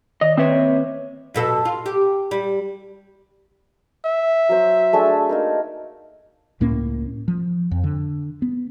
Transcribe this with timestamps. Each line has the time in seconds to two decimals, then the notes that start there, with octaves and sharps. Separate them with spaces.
0.21 D#3 D5 D#5
0.38 D#3 A#3 C4 B4 C#5 E5
1.34 F#2 B2 A4
1.65 F4
1.86 G4
2.31 G3
4.05 E5
4.49 F#3 C5
4.93 A3 D4 G#4
5.29 A#3 D#4 A#4
6.60 C#2 A2 A#3 C#4
7.28 F3
7.71 F2
7.84 D3
8.42 B3